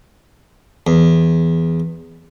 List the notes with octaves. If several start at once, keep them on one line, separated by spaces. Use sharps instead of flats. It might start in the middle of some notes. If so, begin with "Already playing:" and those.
E2